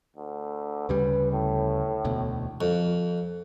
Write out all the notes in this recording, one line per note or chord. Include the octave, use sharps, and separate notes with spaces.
D2
D2 C#3 G3 B4
A2
E1 D2 B2
F2